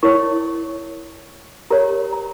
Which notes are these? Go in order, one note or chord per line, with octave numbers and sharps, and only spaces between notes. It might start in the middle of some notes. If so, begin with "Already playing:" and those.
E4 A#4 C#5 C#6
G4 A#4 C#5 A#5
A#5